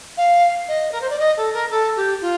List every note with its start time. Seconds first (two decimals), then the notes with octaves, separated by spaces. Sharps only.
0.17 F5
0.68 D#5
0.91 A#4
1.01 C5
1.09 D5
1.19 D#5
1.37 A4
1.53 A#4
1.70 A4
1.96 G4
2.21 F4